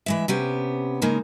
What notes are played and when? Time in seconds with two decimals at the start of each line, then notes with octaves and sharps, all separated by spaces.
0.06 E3 G#3 E5
0.28 C3 B3 C#4 G4
1.02 C#3 G#3 A#3 D#4